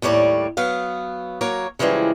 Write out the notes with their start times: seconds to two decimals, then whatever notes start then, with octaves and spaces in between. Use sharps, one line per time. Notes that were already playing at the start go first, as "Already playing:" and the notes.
0.02 D#2 A2 G3 C#5 D5
0.57 F#3 B3 F5
1.41 F#3 A#3 A#4 C#5
1.79 C#3 E3 F3 G3 G#3